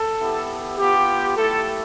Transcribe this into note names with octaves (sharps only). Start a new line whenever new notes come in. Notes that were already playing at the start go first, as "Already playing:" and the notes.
Already playing: A4
B3 E4 G4
B3 F4 G4
A3 E4 G4 A4